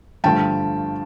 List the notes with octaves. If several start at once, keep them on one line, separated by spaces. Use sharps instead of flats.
G2 D3 F3 A3 G5 A5